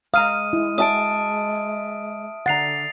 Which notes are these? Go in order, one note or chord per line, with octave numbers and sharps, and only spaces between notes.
G#3 F5 A#5 D#6 F6 D#7
E4
E5 A5 D#6 D7
D3 F#5 A#5 A6 C7 F7